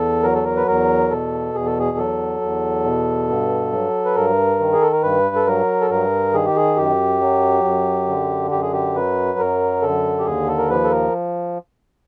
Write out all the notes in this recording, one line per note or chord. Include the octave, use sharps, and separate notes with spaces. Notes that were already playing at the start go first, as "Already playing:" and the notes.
Already playing: E2 A4
F#3 A#4
A4
A#4
B4
E2 A#4
B2 A4
E2 G#4
A4
G#4
F#3 A4
E2
B2
G2
F#3
B4
G2 A#4
D#3
G#4
A4
A#4
G2 B4
A4
F#3 A#4
A4
G2 A#4
D#3 G#4
G4
G#4
F#2 G4
F#3
F#2
D3
F#2 G4
G#4
G4
F#3 B4
F#2 A#4
D3 A4
G4
D#2 G#4
A4
A#4
F3 B4
A4
A#4